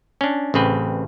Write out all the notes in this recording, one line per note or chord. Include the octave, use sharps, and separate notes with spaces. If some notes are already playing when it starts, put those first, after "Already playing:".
C#4 D4
A1 C#3 C4 B4